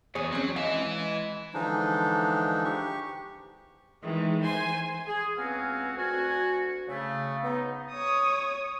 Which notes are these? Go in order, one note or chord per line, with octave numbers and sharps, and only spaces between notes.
E2 G#4 C#5
F#3 C4 C#4
E3 G#3 E4 F5
D3 E3 F3 G#3 D4 D#4
G4 C#6
D#3 E3 G#3
E3 C5 G#5 C6
G#4
C#2 B3 C4 F#4 F5 G#5
D2 F#4 G#5
C#3 A3
B3 D#4
C#5 D#6